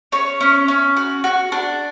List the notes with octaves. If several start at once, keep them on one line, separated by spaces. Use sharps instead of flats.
C#4 C#5
C#4
C#4
F#4
F#4
D4